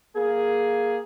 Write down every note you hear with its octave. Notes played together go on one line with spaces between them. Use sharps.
A#3 G#4